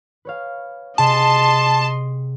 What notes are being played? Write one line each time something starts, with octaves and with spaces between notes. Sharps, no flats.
B4 C#5 F5
C3 G#4 D#5 A5 C6 D7